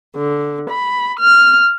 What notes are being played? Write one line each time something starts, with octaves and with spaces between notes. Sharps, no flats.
D3
B5
F6